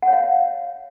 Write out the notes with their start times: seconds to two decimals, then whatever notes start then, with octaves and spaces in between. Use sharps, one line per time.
0.02 F#5
0.08 C#5
0.13 F5